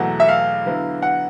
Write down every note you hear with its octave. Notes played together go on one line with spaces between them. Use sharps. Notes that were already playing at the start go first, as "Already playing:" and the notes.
Already playing: E2 B2 F#3 A3 F#5
E5
F5
D3 F#3 B3 E4
F#5